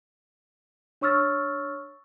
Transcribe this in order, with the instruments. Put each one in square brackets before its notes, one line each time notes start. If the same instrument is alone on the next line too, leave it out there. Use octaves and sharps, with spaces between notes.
[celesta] D4 C#5 C#6 E6 F6 A6